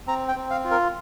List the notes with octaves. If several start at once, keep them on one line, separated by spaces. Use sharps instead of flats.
C4 A#5
G5
C4
F5
F4
A#4